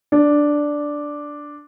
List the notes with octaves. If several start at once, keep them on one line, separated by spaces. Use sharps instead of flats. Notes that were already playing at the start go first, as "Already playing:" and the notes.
D4